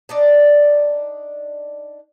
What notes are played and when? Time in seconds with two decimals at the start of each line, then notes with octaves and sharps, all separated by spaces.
0.09 D4 D#4 D5